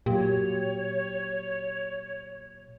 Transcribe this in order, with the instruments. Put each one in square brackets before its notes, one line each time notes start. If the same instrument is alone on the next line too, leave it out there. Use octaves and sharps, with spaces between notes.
[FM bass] A#2 [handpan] F#3 G4 [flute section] C#5